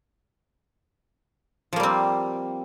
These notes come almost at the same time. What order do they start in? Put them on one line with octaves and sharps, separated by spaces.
F3 A#3 G3 C4